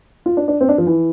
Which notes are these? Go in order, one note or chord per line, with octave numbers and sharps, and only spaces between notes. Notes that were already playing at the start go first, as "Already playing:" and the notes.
F4
D4
D4
C4
D4
F3
E3